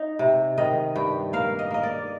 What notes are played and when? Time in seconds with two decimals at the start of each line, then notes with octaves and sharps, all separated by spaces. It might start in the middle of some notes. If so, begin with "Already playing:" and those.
Already playing: D#4
0.19 C3
0.58 D#3 D#5
0.96 G2 G5
1.33 A#3 F5
1.59 D#5
1.71 A#3 D#5
1.83 D5